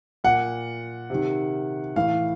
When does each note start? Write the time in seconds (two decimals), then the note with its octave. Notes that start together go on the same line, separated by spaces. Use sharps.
0.24 A#2 F#5
1.10 C3 D#3
1.96 A2 E3 F5